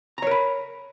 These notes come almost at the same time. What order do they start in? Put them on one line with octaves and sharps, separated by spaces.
A#5 C#5 A#4 B5